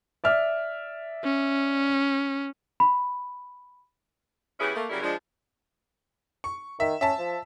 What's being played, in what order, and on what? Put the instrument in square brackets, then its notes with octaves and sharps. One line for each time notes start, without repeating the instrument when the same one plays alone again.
[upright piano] D5 E5 F6
[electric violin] C#4
[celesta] B5
[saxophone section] E3 B3 C#4 E4 G4 G#4
A3 A#3
C#3 F#3 G3 E4 A#4
F3 G#3 D4
[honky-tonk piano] C#6
[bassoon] D#3 [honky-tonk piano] E5
[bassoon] C#4 [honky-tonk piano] E5 A5
[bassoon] F3